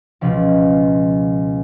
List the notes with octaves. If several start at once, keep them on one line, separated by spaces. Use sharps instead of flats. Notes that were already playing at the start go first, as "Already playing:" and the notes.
C#2 B2 F3